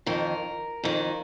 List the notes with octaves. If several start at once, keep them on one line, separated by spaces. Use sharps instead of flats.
F2 D#3 A#4
F2 D#3